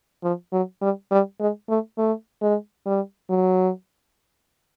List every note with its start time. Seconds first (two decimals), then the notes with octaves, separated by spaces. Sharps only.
0.23 F3
0.53 F#3
0.82 G3
1.11 G3
1.40 G#3
1.69 A3
1.98 A3
2.42 G#3
2.86 G3
3.30 F#3